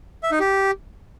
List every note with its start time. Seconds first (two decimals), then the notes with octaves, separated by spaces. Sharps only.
0.23 E5
0.31 D#4
0.40 G4